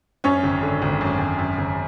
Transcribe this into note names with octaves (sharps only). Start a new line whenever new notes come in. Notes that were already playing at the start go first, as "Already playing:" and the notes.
F#2 C#4 C#5
G#1
D3
G#1
F#2
G#1
F#2
G#1